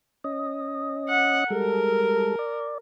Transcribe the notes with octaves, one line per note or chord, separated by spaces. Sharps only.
C#4 D#5
F#5
G3 G#3 A4 A#4
D5